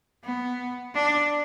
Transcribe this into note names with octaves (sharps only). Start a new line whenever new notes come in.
B3
D4